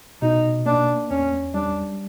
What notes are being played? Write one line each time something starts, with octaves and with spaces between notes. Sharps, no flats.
B2 D#4
A#3 D4
E2 C#4
G3 D4